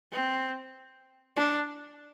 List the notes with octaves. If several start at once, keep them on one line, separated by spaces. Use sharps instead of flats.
C4
D4